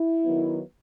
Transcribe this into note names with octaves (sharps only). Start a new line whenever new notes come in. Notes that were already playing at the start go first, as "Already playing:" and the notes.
Already playing: E4
D#3 F#3 B3